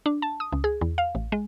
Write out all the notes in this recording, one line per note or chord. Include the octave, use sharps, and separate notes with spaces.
D4
A5
D#6
C#2
G#4
E2
F5
A1
G#3